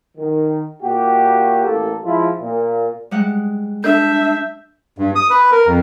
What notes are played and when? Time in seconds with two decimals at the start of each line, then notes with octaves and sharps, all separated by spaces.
0.17 D#3
0.83 A#2 F#4 G4
1.65 A1 A#3 A4
2.03 F3 G#3 E4 F4
2.40 A#2
3.11 G3 G#3 F#5
3.84 D4 E5 G6
4.98 G2
5.15 D#6
5.30 B4
5.52 A#4
5.67 F2